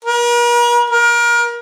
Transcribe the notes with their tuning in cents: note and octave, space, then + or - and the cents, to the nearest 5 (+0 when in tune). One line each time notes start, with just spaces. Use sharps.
A#4 +45
A#4 +30